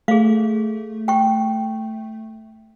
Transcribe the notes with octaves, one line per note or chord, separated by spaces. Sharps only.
A3 G#4 F5
G5 C#6